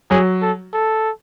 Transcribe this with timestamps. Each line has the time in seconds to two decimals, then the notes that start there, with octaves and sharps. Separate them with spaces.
0.10 F#3 G#4
0.42 A4
0.73 A4